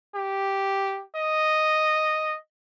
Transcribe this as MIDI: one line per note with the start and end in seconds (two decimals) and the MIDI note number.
0.15 1.03 67
1.15 2.37 75